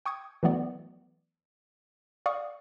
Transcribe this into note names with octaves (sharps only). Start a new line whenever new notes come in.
G5 C#6 D#6 G#6
E3 F#3 A3 B3 D5
D5 F5 C#6 D#6